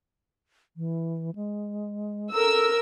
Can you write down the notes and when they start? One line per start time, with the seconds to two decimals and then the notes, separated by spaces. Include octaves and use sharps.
0.77 E3
1.35 G#3
2.34 A4 A#4 E6